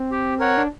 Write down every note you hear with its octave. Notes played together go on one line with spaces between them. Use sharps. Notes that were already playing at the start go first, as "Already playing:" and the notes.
Already playing: C4
G4
A#4 C#5 F#5
D4